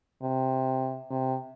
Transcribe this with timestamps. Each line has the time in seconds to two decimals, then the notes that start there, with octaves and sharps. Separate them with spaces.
0.22 C3
1.11 C3